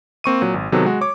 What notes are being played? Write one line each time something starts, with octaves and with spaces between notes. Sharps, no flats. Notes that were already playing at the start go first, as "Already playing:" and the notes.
A#3 C4 C#6 D#7
A#2 F#3
G#1
C3 D#3 F#3 B3 A4
G#3 F#4
C#5 D6